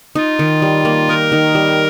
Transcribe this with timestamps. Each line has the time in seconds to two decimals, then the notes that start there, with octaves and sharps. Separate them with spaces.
0.15 D#4 F4
0.39 D#3
0.62 G3
0.85 A#3
1.09 D#4 A#4
1.32 D#3
1.55 G3